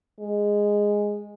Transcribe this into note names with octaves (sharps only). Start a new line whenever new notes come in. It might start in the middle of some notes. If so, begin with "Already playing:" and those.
G#3